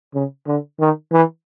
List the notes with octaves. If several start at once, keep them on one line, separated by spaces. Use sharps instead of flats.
C#3
D3
D#3
E3